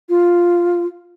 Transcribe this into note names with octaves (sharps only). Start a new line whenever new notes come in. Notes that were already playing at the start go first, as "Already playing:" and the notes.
F4